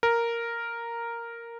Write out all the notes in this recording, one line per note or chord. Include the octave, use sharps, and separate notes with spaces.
A#4